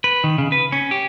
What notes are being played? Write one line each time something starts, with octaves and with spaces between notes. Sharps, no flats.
B4
D#3
C#3
B4
C#4
G4